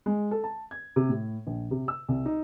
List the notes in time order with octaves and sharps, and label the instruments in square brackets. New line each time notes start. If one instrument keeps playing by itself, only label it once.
[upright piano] G#3
A4
A5
G#6
C3
A2
A#1
C3
E6
C2
D#4